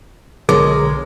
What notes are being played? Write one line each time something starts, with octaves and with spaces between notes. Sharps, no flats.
B1 D3 G#3 B3 G#4 A#4 C#5